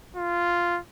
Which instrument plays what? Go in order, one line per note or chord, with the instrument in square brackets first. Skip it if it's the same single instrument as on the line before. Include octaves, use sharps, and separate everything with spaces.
[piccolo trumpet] F4